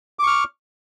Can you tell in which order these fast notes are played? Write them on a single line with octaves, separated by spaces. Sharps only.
D6 C#6 F6